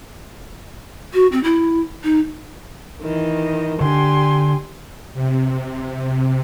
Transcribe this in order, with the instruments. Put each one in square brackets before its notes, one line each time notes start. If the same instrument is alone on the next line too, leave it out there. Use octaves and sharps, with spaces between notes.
[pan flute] F#4
C4
E4
D#4
[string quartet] D#3 E3 D#5
[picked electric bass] D3 D4 [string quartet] G4 G#5 C6
[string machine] C3